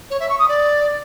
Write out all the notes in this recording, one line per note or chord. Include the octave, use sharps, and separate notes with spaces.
C#5
E5
C#6
D#6
D5